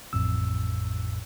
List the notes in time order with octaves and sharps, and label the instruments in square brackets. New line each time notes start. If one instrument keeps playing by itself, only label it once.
[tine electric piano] A1 F2 A2 E6